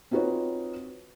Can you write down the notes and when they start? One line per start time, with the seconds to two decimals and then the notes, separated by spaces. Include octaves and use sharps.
0.11 C4 D#4 F4 F#4 B4 C#5